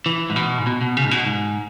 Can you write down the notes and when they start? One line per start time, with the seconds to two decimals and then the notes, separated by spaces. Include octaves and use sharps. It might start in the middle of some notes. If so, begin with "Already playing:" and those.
0.06 E3
0.30 G#2
0.36 B2
0.58 G#2
0.67 B2
0.81 B2
0.97 C#3
1.05 G#2
1.11 B2
1.26 G#2